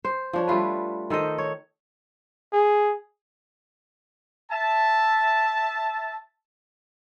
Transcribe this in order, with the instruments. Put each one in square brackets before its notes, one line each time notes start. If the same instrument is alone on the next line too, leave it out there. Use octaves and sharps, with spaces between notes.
[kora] C5
F3 D4 C#5
G3 A3 F4 B4
D#3 A4 C5 D#5
C#5
[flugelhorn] G#4
[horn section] E5 A5